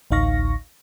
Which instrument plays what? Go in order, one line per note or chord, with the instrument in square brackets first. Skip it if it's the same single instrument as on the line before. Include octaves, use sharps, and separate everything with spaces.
[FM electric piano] A1 D2 D#4 F5 C#6 A#6